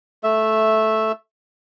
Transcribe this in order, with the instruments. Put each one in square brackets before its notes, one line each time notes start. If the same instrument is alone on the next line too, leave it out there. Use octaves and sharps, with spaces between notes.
[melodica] A3 E5